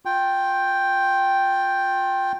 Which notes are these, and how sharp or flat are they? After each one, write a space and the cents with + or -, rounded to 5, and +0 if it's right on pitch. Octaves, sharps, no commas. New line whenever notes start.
F4 +25 G5 +0